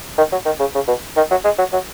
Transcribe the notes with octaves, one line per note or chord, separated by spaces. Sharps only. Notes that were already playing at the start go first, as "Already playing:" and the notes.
D#3
F#3
D#3
C#3
C#3
B2
D#3
F#3
G#3
F#3
F#3